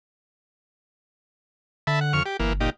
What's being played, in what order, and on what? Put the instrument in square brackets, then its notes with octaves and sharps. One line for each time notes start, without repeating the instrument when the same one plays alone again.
[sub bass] D3 [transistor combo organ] E5 A5 B5
[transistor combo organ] F#5
F2 C#6 F6
G4
[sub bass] G1 [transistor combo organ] E3 A#3
[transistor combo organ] A#2 D#4 G4